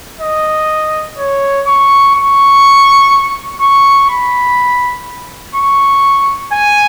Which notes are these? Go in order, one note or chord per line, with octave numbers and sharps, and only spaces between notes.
D#5
C#5
C#6
C#6
C#6
B5
C#6
G#5